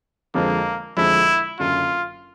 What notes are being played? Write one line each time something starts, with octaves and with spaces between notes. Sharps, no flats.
F2 D3 F3 G#3 A#3
F2 D3 F3 G#3 E4
F#1 F#2 D3 F4